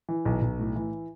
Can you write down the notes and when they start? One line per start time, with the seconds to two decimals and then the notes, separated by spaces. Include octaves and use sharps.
0.09 E3
0.25 B1
0.42 B1
0.59 A2
0.76 E3